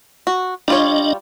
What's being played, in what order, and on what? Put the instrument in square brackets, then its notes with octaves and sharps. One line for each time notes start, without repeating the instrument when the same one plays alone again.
[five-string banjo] F#4
[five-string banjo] G3 F4 C#5 [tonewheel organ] D4 D#5